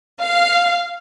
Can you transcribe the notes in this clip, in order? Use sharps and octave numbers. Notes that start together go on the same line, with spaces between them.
F5